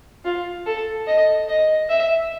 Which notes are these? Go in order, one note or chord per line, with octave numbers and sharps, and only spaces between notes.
F4
A4
D#5
D#5
E5